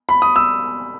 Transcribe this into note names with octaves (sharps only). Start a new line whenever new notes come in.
B5
D#6
E6